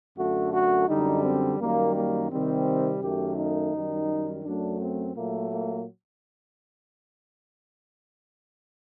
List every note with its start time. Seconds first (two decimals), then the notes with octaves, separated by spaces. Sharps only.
0.16 F#2 D3 A3 F#4
0.52 F#4
0.88 F#2 D3 G3 D#4
1.23 C4
1.59 F#2 D#3 G3 A#3
1.94 A#3
2.30 C3 D#3 G3 C4
3.02 F#2 D#3 A3 G4
3.37 D#4
3.73 F#2 D#3 G3
4.44 F#2 F#3 A3 D4
4.80 C4
5.16 A#2 F#3 A3 A#3
5.51 A#3